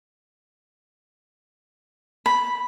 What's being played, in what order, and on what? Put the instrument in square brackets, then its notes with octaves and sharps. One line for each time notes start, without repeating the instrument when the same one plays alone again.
[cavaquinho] B5